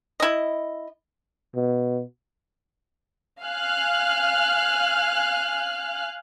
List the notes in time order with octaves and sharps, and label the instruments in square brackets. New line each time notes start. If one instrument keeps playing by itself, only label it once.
[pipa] E4 D#5
[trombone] B2
[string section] F5 G#5 F6 F#6